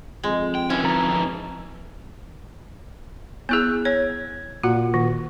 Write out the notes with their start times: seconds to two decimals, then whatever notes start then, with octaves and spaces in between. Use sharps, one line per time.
0.24 F2 G#3
0.55 G5
0.70 C#4 D#4 E4 B4
0.83 F3 A4 A#5
1.10 G#1
3.49 B3 E4 G#4 E6 F#6 G6
3.85 C#5 G#6
4.63 A#2 F#4 F#5
4.94 D#3